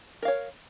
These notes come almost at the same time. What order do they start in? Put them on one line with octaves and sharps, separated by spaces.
A#4 F5 C#5